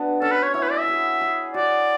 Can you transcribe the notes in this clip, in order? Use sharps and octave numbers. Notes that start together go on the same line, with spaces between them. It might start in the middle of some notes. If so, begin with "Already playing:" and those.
Already playing: B3 D4 F#4
C#4 A4
B4
C#5
E4 C#5
B4
D5
E5
G#4
G#4
F#4 D5